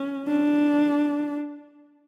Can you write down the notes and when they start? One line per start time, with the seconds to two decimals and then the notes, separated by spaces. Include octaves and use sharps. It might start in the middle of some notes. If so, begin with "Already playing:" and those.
Already playing: C#4
0.28 D4